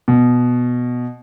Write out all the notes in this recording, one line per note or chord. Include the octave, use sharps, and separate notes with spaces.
B2